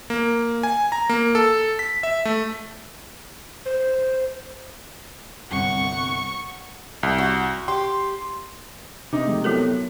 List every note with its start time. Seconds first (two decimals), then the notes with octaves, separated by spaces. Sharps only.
0.10 A#3
0.63 G#5
0.92 A#5
1.09 A#3
1.35 A4
1.79 B6
2.03 E5
2.25 A3
3.65 C5
5.52 G1 C2 F#5 C#6
7.03 C2
7.18 F#4
7.68 G4 C6
9.13 C3 D#4 D6
9.26 F3 G#3 A3
9.44 F#3 B3 E4 F#4 A4 A#4